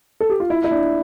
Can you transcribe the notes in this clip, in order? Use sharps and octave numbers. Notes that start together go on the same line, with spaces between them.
A4
G4
F4
E4
E4
D4